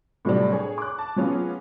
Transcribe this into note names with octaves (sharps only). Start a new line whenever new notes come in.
A2 C3 F#3 G3 C4 D4
G#4 C#5
D6 F#6
A5
F#3 B3 C#4 F4 G#4